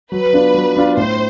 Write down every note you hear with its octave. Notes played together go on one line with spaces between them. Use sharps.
F#3 B4
B3 D4 F4
F#3
B3 D4 F4
A2 C5